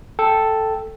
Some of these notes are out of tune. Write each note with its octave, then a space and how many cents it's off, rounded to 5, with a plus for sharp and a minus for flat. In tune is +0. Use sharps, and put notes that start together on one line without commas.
A4 +0 G5 +0